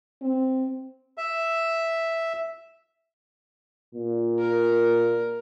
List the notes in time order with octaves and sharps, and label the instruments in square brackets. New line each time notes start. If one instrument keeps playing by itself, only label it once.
[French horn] C4
[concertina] E5
[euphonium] A#2
[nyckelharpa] A#4